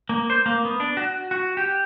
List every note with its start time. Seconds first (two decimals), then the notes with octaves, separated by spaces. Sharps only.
0.09 A#3
0.30 C5
0.46 A#3
0.65 B3
0.80 D4
0.97 F#4
1.31 F#4
1.57 G4